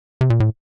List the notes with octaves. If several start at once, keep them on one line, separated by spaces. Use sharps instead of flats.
C3
A#2
A2